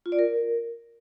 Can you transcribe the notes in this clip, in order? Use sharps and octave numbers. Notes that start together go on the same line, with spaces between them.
F4
D5
A#4